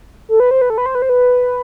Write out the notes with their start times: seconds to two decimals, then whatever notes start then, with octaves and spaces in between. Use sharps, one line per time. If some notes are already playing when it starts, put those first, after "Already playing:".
0.29 A4
0.40 B4
0.51 C5
0.61 B4
0.70 A4
0.78 B4
0.86 C5
0.95 B4
1.02 C5
1.09 B4